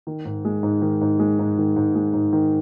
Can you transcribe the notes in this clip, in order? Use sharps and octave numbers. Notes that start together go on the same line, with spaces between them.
D#3
G#2
G#3
G#2
D#3
G#2
G#3
G#2
D#3
G#2
G#3
G#2
D#3